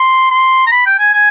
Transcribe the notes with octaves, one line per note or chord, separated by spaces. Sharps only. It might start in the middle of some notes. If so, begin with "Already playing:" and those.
Already playing: C6
C6
A#5
B5
G5
G#5
G#5